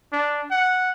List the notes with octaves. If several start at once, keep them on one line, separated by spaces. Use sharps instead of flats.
D4
F#5